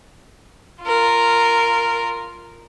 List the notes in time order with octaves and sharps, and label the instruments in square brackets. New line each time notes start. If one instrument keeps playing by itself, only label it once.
[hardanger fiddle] F4 A#4